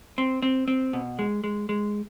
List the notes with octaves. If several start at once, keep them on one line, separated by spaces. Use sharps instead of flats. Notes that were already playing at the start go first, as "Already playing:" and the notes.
C4
C4
C4
B2
G#3
G#3
G#3